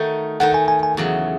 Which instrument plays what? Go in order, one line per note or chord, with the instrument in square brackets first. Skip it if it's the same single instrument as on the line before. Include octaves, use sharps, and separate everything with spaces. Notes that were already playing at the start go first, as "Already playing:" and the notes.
Already playing: [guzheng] D#3 A3 D#4 F#4
[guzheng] D#3 A3 D#4 [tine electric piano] F#5
[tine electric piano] G#5
G#5
G#5
[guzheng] E2 C#3 F#3